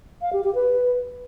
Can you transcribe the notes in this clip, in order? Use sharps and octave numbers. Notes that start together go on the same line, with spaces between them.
F5
G4
G4
B4